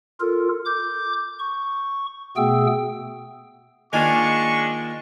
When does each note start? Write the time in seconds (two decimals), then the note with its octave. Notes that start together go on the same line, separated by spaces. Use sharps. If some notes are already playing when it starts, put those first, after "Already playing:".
0.20 F4 A4 A#4
0.65 D6 G6
1.39 C#6
2.37 B2 A3 B3 G#4 G5 E6
3.93 D#3 G#3 A#3 D4 F4 G#5 C#6